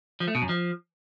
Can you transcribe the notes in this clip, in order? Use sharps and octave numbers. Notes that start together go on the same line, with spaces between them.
F3
A3
B2
F#2
F3